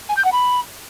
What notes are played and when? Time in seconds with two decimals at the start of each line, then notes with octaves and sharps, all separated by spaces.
0.09 G#5
0.17 G6
0.25 F#5
0.32 B5